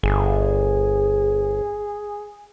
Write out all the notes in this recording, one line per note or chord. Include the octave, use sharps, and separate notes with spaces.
G1 G#4